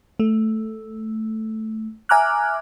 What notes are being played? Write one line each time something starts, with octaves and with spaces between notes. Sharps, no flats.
A3
E5 G#5 A#5 D6 F6 F#6